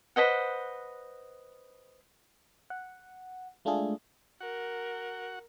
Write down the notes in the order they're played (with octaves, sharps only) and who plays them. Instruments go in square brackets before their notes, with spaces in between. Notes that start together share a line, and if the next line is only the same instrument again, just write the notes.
[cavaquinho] B4 C5 D#5 F#5
[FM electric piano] F#5
G#3 A3 D4 F4 G#4 A4
[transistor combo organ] F#4 F#5 [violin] A#4